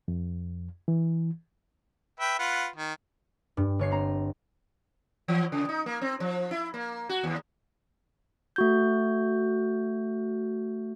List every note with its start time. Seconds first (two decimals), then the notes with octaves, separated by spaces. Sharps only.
0.08 F2
0.88 E3
2.20 B4 E5 G5
2.39 F4 B4 F#5
2.76 D#3
3.57 G2
3.79 G1 C#5 C7
3.91 C4 A#5 C7
5.28 E3
5.52 C#3
5.69 D#4
5.86 A#3
6.02 C4
6.20 F3
6.51 E4
6.74 A#3
7.09 F#4
7.24 D#2
8.56 A3 F#4 G6